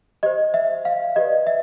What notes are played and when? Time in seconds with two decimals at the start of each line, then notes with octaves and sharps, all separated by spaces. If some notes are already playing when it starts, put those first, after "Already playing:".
0.23 G4 C5 D#5
0.54 E5
0.85 F5
1.16 G4 B4 D5 D#5
1.47 E5